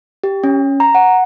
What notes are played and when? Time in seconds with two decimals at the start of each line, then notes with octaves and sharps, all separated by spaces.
0.24 G4
0.44 C#4
0.80 A#5
0.95 F#5